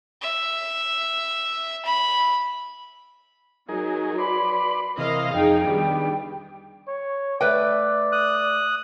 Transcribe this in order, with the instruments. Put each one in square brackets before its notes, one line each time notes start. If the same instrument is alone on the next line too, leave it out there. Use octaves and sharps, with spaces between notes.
[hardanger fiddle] E5
B5
[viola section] F#3 [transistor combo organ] D#4 G#4 A#4
[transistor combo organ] B4 D5 C6 [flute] B5
[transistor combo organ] C3 E3 [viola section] A#4 D#5 F5
[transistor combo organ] F2 [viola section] D#4 G#4 [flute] G5
[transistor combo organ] D#3 B3 D4 [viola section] G3
[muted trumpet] C#5
[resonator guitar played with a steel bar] A3 B4 G5 [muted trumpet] D5
[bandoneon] D#6 F#6